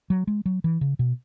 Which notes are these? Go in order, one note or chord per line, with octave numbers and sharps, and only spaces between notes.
F#3
G#3
F#3
E3
C#3
B2